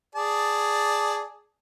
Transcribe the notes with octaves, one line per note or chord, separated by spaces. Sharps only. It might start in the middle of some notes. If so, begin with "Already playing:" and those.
G#4 D5 A5